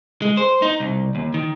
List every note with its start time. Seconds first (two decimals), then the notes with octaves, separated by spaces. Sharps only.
0.22 G#3
0.37 C5
0.62 D#4
0.80 C2
1.15 D#2
1.34 D#3